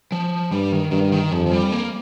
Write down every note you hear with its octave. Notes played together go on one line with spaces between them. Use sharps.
F3
G2 G3
D#3
G2 D#3
D#3
F2 F3
F3
G3
A#3